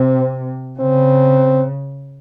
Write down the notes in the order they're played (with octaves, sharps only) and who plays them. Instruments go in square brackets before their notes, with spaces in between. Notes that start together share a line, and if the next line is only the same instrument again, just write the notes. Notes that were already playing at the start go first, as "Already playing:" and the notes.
Already playing: [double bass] C3 [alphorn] C4
[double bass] C#3 [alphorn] C4